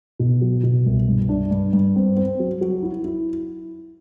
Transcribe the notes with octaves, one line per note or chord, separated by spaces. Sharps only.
B2
F#3
B2
C2
G2
D4
G2
G2
C4
C4
F#3
F#3
E4
E4